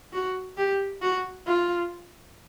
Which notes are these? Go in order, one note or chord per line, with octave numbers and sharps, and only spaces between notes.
F#4
G4
F#4
F4